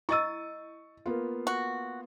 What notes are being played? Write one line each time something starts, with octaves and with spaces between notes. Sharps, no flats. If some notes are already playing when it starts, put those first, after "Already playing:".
E4 D#5 C#6 E6 A6 D#7
A#3 B3 F4
F#4